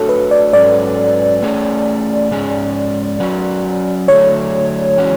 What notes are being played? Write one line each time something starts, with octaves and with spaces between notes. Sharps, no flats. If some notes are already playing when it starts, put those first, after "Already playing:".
Already playing: A3 D4 F#4 A4 C#5
B4
D5
G#2 F#3 C#4 D5
A3 C#4 G#4 C#5
G#2 G#3 C#4 G#4
F#3 C#4 F#4 B4
D3 F#3 A3 C#5
E3 G#3 C#4 F#4